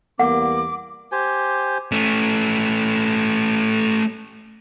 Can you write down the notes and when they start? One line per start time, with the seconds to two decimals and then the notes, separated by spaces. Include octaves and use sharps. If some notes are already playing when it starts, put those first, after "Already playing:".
0.19 E2 G3 A#3 B3 F#5 D6
1.12 G4 C5 G#5
1.92 A3 C#4